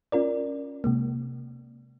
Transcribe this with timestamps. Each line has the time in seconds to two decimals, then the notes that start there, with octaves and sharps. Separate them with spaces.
0.12 C#4 F4 A#4 D5
0.84 C3 G#3 A#3